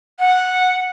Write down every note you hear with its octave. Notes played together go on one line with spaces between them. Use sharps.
F#5